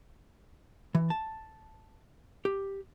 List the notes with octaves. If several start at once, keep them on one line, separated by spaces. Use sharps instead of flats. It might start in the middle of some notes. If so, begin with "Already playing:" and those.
E3
A5
G4